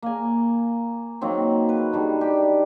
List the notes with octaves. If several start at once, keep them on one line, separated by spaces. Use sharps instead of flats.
A#3 G#5
D#3 F#3 A#3 C4
B4
D3 D#3 G3
G4